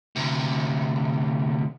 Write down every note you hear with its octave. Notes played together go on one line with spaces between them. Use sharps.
D2 C3